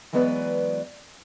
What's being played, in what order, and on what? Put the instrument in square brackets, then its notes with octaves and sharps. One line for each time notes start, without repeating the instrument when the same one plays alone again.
[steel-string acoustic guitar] E3 F#3 G#3 B3 B4 D5